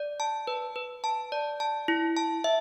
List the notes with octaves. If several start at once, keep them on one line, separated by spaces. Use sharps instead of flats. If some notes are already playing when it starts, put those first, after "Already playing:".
Already playing: D5
A5
B4
B4
A5
D5
A5
E4
A5
E5